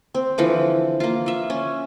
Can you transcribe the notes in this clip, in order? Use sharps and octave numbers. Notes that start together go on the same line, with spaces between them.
C4
D3 E3 F3
A#3 F4
F4 E5
C#4